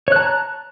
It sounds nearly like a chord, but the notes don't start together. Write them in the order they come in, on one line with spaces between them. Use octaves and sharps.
C#5 F#6 A5 A#5